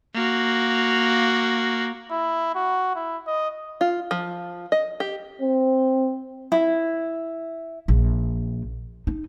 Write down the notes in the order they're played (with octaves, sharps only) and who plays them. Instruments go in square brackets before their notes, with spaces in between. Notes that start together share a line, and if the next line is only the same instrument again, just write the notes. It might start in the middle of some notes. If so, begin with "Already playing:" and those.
[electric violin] A#3 F#4
[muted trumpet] E4
F#4
E4
D#5
[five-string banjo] F4
F3
D#5
G4
[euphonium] C4
[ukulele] E4
[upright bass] A#1
D#4